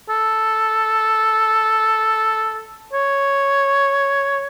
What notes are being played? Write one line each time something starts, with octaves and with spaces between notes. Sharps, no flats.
A4
C#5